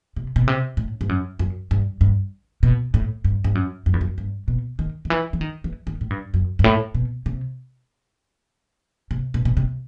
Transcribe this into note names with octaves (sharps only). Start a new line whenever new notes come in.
C3
B2
C3
A2
G2
F#2
F#2
G2
G2
B2
A2
G2
G2
F#2
F#2
E2
F#2
G2
B2
D#3
D#3
E3
E3
D#3
E3
D#3
A2
G2
F#2
G2
A2
B2
C3
C3
B2
B2
C3